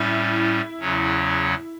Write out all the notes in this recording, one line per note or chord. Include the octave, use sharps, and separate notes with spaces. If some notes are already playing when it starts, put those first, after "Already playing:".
Already playing: A2 G3 C#4 E4
E2 C#3 F#3 C#4